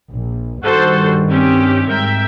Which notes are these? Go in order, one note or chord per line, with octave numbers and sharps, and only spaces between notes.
A#1
G2 D#3 G3 F#4 A4 C5
C4 C#4 G4
G#2 A#4 E5 G5